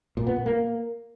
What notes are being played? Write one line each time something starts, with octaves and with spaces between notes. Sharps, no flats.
A#2
B3
A#2
A#3